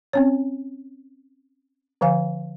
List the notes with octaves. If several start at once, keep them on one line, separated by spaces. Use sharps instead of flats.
C4 C#4 C#5
D3 F3 F5 G#5